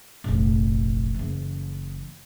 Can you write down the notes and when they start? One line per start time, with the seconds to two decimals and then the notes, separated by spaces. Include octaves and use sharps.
0.24 F1 A#1
1.15 F#1 E3